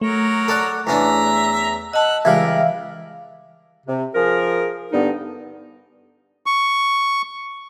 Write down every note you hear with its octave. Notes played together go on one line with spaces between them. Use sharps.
F#3 A3 A#4 C#5
A4 D5 F#5
E2 C#4 D4 E5 A#5
D#5 F#5 A5 E6
C#2 E3 G3 A#4 E5 F5
C3
F3 G#4 A#4
G2 D3 B3 D#4
C#6